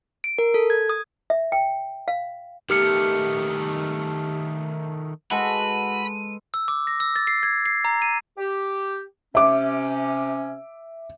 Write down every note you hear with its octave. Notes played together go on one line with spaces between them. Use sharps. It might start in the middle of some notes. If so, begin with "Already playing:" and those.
D7
A#4
A4
G#6
D#6
E5
G5
F5
D#3 A3 G4 F6 C#7
G#3 F#4 A4 B4 B5 D#7
E6
D6
A#6
E6
A6
C7
G#6
C7
A#5
D#7
G4
C3 C#4 E5 D6